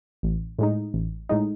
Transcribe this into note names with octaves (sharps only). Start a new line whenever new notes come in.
A1
A2 G#3 D#4
A1
A2 G#3 D#4